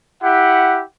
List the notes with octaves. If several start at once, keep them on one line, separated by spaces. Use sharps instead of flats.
E4 G4 F#5